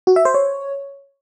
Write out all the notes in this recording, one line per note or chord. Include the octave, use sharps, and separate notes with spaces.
F#4
E5
C5
C#5